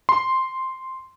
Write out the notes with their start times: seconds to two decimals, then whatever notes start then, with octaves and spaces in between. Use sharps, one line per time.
0.09 C6